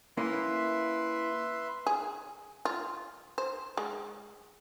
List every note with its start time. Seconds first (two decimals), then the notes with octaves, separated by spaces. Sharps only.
0.17 A#3 C#4 E4 B4 E5 C6
1.87 G#4
2.65 F4
3.38 C5
3.77 G#3